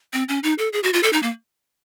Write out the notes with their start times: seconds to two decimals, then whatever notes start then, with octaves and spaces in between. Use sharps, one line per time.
0.13 C4
0.29 C#4
0.43 D#4
0.58 A4
0.73 G#4
0.83 F#4
0.93 F4
1.03 A4
1.13 D#4
1.23 A#3